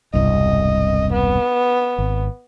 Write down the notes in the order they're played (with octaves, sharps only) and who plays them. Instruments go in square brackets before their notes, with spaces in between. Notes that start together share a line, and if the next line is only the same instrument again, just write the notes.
[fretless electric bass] E1 C2 G2 [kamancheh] D#5
[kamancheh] B3
[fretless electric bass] G#1